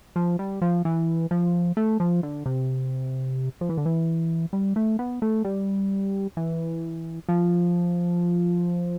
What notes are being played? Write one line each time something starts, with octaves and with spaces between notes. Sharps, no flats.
F3
G3
F3
E3
F3
A3
F3
D3
C3
F3
E3
D3
E3
G3
A3
B3
A3
G3
E3
F3